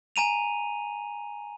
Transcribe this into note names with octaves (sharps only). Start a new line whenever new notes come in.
G#5 A#5 D#7 F7